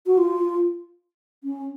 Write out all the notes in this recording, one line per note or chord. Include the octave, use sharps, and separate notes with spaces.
F#4
F4
C#4